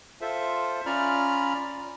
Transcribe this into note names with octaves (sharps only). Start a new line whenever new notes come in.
F4 A4 C5 E5
C#4 F4 D5 A#5 B5 F6